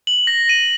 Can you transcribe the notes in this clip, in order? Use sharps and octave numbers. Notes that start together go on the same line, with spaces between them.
F#7
A#6
D#7